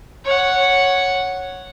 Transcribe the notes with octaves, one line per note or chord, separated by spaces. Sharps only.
C#5 F#5